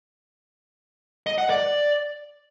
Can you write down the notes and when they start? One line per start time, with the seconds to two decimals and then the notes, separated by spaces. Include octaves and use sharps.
1.27 D#5
1.38 F#5
1.50 D5